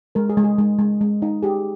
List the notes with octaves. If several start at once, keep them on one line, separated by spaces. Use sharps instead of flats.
G#3 A#4
G#4
G#3
G#4
G#3
G#3
G#3
D#4
G4 G#4